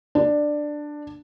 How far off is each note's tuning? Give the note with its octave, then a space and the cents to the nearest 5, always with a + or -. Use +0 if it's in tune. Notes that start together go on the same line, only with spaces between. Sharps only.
D4 +10